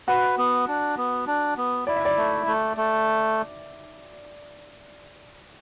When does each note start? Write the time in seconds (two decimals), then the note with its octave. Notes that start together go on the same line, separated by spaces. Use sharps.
0.08 F#4 B4
0.38 B3
0.68 D4
0.97 B3
1.27 D4
1.57 B3
1.87 E4 D5
1.96 E5
2.05 D5
2.17 A3
2.47 A3
2.77 A3